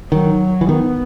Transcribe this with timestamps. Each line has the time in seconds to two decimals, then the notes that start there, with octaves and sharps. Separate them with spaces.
0.11 D#3 F#3
0.61 E3
0.69 D#3 B3